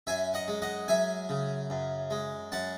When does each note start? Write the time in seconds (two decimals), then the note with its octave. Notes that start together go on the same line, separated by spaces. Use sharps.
0.07 F#2 E5 G#5
0.34 D#5 F#5
0.48 G#3
0.62 D#5 F#5
0.88 F#2 E5 G#5
1.29 C#3
1.70 F#2
2.11 G#3
2.52 F#2 F#5 A5